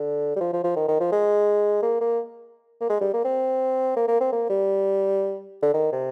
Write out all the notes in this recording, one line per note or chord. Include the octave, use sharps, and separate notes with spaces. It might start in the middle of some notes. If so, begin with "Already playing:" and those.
Already playing: D3
G3
F3
F3
F3
D#3
D#3
F3
G#3
A#3
A#3
A#3
G#3
G3
A#3
C4
A#3
A#3
C4
A#3
G3
D3
D#3
C3